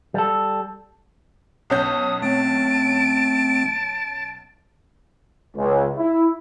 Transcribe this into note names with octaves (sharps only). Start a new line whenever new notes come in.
G3 A4
B1 C#4 D#6 G6
A3 C4 A5 D7
C#2
E4